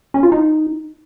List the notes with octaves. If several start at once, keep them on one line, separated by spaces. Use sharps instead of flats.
C#4
F4
D#4